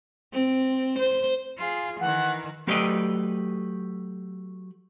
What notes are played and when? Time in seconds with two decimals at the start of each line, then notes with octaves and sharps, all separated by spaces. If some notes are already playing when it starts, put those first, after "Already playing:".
0.33 C4
0.99 C5
1.58 F4 G#4
2.00 D#3 E3 F#5
2.67 F#3 A3 G4 B4 D5 D#5